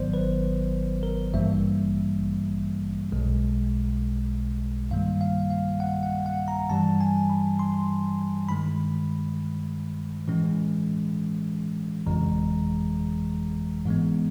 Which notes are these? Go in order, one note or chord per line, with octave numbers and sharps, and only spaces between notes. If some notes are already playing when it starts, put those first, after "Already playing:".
Already playing: G#1 G#2 D#3 F#3 B3 C5 D5
B4
A#4
A1 G2 E3 G3 A#3 E5
B1 B2 G#3
G2 D#3 G3 A#3 F5
F5
F5
F#5
F#5
F#5
A#5
G2 E3 G3 A5
G#5
B5
C6
G2 D#3 G#3 B5
A2 E3 G#3 C#4
G1 F2 C#3 E3 G#3 A#5
G#2 E3 G#3 B3